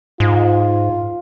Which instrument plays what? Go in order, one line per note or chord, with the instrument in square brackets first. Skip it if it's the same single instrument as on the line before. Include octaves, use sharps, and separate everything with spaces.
[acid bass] G#2 [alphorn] F4